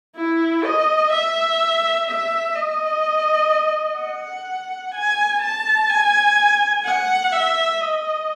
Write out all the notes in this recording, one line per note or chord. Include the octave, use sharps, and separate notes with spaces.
E4
D#5
E5
E5
D#5
F#5
G#5
A5
G#5
F#5
E5
D#5